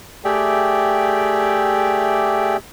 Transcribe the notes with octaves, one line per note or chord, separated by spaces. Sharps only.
A3 G4 G#4 D5 E5 G5